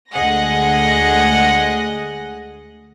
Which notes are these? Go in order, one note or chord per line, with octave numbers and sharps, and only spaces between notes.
D2 G#3 G#4 D#5 F#5 A#6